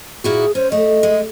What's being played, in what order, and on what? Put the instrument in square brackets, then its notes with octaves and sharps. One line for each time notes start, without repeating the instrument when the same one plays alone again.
[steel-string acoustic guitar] A#2 E4 F#4 [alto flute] G#4
[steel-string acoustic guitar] C#4 [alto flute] C5
[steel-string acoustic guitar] A3 [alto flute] D#5
[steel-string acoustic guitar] G#3